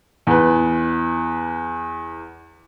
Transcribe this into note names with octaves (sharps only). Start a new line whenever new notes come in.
E2 B4